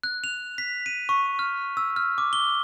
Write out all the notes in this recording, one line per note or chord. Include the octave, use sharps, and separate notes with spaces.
F#6
F7
B6
D#7
C#6
F6
E6
F6
D6
G7